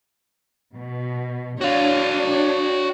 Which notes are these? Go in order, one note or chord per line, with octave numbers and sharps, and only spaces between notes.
B2
D4 F#4 C#5 F5